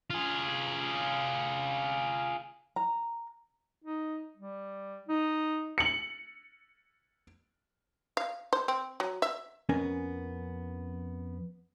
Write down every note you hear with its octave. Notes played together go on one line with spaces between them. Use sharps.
F4 G#4
A#5
D#4
G3
D#4
C#7 F#7
F5
C5
C4
F#3
E5
F2 B3 C#4 A#4 G#5